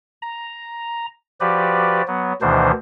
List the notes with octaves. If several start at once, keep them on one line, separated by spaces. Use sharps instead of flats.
A#5
F3 F#4 G4 B4 D5
F#3 B3
D2 B2 D#3 E3 D4 C5